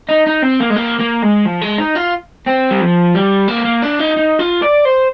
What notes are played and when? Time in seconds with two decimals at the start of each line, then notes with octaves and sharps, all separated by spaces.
0.09 D#4
0.27 D#4
0.42 C4
0.61 A#3
0.70 G#3
0.76 A#3
1.00 A#3
1.23 G#3
1.46 F3
1.62 G#3
1.78 D#4
1.96 F4
2.47 C4
2.71 G3
2.81 F3
3.15 G3
3.48 A#3
3.65 A#3
3.83 D4
4.00 D#4
4.17 D#4
4.39 F4
4.62 D5
4.85 C5